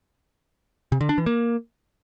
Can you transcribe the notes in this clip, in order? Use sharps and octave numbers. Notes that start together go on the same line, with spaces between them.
C3
D3
D4
E3
A#3